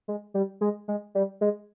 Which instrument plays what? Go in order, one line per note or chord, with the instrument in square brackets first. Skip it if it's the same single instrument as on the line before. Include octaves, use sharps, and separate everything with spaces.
[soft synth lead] G#3
G3
G#3
G#3
G3
G#3